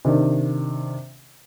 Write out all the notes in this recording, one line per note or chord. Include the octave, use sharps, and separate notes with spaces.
C3 D#3 D4